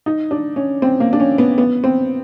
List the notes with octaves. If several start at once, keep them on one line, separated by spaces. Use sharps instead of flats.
D#4
D4
C#4
C4
A#3
D4
C#4
B3
B3
C4